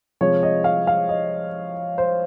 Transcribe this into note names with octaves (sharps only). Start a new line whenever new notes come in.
C3 F3 G#3 C#5
D#5
F5
F5
D#5
C5